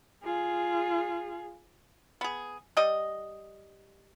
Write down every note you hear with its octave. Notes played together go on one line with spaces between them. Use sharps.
F4 G#4
B3 G#4
G3 D#5